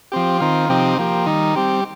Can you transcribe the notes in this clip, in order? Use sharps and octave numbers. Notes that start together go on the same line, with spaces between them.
F3 C4 G4
D#3 C4 F4
C3 F3 C4 D#4 G4
F3 A#3 G4
D#3 G3 D#4
G3 C4 G4